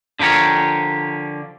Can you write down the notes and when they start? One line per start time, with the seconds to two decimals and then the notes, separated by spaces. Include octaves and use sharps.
0.19 D3 F3 G4 A#4 C#5